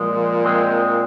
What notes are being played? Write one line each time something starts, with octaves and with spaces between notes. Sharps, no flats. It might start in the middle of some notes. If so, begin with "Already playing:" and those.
Already playing: A#2 F3 G#3
G#3 C4